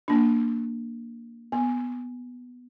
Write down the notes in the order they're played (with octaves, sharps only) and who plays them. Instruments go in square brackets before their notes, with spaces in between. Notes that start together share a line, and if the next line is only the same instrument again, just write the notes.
[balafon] A#3 D4
B3